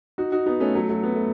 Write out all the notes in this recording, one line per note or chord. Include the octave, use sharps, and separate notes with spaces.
D#4 F#4
D#4 F#4
B3 D#4
A3 C#4
F#3 A3
F#3 A3
B3
A3